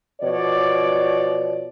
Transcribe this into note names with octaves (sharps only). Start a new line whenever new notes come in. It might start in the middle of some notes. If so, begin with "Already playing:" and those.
B2 F3 C#5 D5